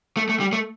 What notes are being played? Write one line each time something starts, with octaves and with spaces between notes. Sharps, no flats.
A3
A3
G3
A3